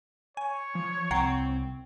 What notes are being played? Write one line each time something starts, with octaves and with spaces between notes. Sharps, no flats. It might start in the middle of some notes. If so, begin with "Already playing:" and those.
C#5 G#5
F3
C2 C4 F#5 G5 A#5 C7